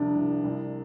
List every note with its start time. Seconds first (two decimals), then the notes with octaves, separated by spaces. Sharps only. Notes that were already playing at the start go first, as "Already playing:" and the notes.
Already playing: C2 C3 F3 D4
0.15 C2
0.44 C2